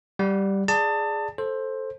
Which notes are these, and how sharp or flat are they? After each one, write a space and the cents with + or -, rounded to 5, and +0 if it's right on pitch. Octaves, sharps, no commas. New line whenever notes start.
G3 +0 F#5 +0
G#4 +0 D5 +0 A5 +25
A4 +0 C5 +15